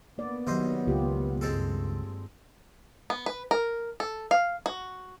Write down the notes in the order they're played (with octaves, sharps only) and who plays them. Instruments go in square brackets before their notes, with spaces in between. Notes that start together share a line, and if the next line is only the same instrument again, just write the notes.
[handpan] A#3 D5 [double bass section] B3
[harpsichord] C2 C5 D#5 [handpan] D#3 F#3
[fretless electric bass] C#2 [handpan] A#3 F4 G4
[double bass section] G2 [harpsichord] G#3 C4 A4
[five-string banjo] B3
B4
A#4
A4
F5
F#4